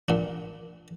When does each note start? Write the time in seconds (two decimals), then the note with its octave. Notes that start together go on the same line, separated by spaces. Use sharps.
0.09 A#2 D4